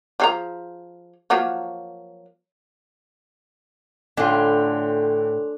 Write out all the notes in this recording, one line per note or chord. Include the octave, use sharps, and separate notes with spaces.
F3 G#4 A#5
F3 F#3 A#3
A2 D3 C#4 D4 F4 G5